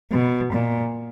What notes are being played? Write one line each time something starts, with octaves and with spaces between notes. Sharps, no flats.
B2
A#2